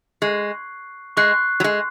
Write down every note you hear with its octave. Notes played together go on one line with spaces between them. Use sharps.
G#3 C#6 F#6 C7
G#3 C#6 F#6 C7
F#3
G#3